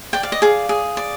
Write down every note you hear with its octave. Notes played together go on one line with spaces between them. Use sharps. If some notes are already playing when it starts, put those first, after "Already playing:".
D5 G5
F5
D#5
G#4 F5
G#4
D5